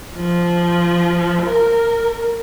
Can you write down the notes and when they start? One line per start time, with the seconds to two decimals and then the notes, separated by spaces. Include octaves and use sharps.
0.15 F3
1.42 A#4